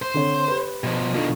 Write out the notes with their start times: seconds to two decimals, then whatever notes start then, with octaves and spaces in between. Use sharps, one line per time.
0.02 C5
0.14 D3 C4 C#5
0.48 G4 B4
0.84 B2 F3
1.14 B2 D#3 D4 F4 A4